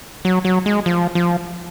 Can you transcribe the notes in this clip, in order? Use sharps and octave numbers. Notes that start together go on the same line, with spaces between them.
F#3
F#3
G#3
F3
F3